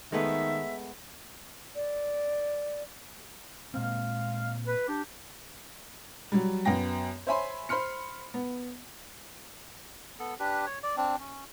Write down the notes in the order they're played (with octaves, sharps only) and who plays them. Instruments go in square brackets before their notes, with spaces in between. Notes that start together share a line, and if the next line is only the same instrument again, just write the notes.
[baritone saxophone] D#3 [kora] G#3 A3 B3 [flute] E5
[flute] D5
[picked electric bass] A#2 A#3 C4 [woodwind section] G#3 F5
[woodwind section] B4
D4 G4
[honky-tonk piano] F#3 G3
F#2 B3 G5 A#6
C5 C#5 E5 G#5 B5 C6
C5 B5 C6 F6 C#7
B3
[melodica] B3 A4
D4 G4 B4
C#5
D5
C4 D4
C#4